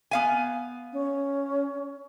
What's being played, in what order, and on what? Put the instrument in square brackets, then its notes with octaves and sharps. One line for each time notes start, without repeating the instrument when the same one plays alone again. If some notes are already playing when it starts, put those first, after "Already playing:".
[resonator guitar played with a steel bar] B3 F5 G#5
[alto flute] C#4